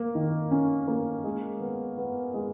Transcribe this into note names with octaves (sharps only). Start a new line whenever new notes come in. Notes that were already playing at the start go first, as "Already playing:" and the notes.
Already playing: A#3
D#3
C#4
A#3
G#3
B3
B3
G#3